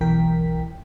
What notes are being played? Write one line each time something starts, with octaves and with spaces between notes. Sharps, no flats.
B1 E2 E3 A#4 G5 B6